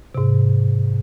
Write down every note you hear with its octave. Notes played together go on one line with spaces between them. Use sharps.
G#2 C3